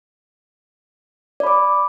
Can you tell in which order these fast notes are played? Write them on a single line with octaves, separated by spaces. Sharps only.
D5 B5 D6